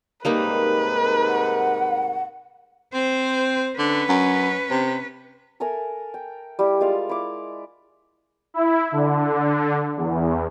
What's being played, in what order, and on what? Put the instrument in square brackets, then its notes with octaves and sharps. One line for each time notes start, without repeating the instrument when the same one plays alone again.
[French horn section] G#2 C3 A#4 [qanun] G3 A#3 D#4 [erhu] B4
[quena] F#5
[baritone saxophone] C4 [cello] C5
[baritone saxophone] D3 [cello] C#4 B4
[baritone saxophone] F#2
C3
[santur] A4 A#4 E5 G#5
G5
G3 E4 G4
G#3 F4 D5 F5
E4 D6
[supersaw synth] E4
D3
E2